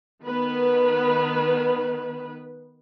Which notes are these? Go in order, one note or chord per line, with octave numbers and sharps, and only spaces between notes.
D#3 B3 B4